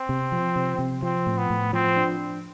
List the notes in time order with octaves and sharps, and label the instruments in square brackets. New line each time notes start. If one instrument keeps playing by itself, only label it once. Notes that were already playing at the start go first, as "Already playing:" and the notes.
Already playing: [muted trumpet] C4
[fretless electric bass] C3
F3
C3
C3
[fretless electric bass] F3 [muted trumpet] C4
[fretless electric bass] A2
[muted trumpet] B3
[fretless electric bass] A2
[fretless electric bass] F3 [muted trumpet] C4
[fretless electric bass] D4